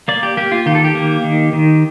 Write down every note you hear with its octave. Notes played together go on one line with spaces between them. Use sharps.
A#3 D5
G4
A#3 G4
F4
D#3 G4
A4
G4
A#3
D#3
D#3